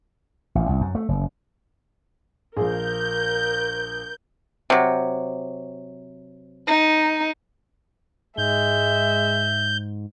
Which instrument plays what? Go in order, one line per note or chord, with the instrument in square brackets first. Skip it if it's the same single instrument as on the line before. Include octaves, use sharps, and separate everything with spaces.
[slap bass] A1
C2
F#2
A3
F#1
[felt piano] A#1 F3 [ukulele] G#4 [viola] A#4 [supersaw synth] G6
[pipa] C3 F#3
[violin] D#4
[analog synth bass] G#2 [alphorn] G#3 [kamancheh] E5 [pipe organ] G6